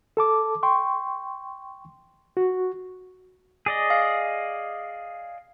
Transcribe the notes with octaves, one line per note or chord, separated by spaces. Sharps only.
A4 A5 D6
G5 C6 C#6
F#4
G#4 D5 D#5
F5